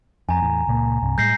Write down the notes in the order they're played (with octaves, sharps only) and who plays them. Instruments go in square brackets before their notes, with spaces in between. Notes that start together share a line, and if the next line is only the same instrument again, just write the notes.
[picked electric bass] F2 [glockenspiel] G#5 A#5
[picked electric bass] E2 A2
C#2 A#2 A#3
C2 G2 C3
[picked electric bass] A2 G3 G#3 [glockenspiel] G6 A#6 C7